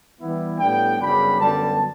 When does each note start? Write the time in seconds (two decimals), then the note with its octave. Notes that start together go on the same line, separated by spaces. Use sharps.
0.19 E3 G3 B3 E4
0.59 A2 G3 B3 D4 G5
1.00 F#2 C#3 G3 B3 D4 B5
1.39 F#2 D3 G3 B3 A5